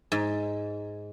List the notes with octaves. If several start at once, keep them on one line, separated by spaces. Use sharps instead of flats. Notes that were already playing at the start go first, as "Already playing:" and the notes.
G#2